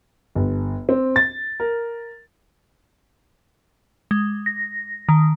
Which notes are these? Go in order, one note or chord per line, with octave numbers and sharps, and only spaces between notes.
G1
C4
A6
A#4
G#3
A#6
D#3